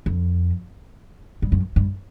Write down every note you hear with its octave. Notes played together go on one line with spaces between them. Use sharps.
F2
G2
F#2
G2